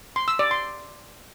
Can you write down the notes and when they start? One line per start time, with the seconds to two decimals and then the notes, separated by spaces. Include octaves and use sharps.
0.16 C6
0.28 E6
0.39 D5
0.51 C6